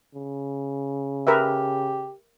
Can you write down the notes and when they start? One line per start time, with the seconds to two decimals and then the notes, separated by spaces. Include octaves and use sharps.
0.15 C#3
1.27 G4 A#4 B4 E5